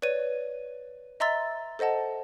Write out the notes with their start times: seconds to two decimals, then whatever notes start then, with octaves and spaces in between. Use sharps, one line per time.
0.02 B4 C#5 D5 D#7
1.20 D#5 E5 A#5 C6 E6 A6
1.79 A4 C5 D#5 F#5 A5